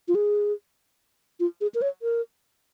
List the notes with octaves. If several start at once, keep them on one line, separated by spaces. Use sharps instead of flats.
F4
G#4
F4
G#4
A#4
C#5
A#4